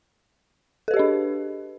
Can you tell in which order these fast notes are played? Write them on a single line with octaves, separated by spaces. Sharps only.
A4 B4 G4 D#5 D4